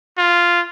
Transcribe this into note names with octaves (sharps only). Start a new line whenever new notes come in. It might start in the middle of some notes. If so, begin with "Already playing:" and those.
F4